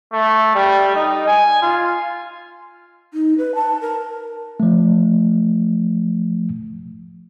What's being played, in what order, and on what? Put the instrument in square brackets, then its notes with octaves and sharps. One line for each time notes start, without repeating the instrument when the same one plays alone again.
[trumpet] A3
G3
D#4
G#5
F4
[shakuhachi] D#4
B4
A5
A#4
[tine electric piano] F3 A3